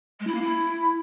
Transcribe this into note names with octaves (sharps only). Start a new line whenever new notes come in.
G#3
E4
A#3
E4